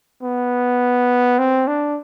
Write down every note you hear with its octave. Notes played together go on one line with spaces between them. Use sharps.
B3
C4
D4